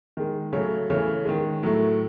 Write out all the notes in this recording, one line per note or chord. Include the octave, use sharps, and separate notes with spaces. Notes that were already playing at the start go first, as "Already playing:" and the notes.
D#3 G#3
C#3 F#3 A3 C#5
C#3 E3 A3 C#5
D#3 G#3
A2 F#3 A3